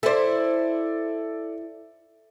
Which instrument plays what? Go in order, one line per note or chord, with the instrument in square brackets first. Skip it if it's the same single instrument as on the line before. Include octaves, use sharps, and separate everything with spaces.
[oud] E4 C5 [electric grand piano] A4 D5